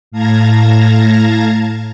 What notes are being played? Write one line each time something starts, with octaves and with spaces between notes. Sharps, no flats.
A2 F5 A5 A#5 G#6 A#6